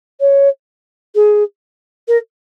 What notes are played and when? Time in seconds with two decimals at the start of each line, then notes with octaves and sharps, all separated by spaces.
0.20 C#5
1.15 G#4
2.08 A#4